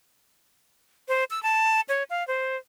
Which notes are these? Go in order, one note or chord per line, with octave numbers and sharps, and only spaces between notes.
C5
E6
A5
C#5
F5
C5